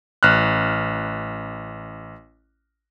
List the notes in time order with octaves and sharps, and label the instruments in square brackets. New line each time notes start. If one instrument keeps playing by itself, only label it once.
[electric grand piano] A1 F6 F#6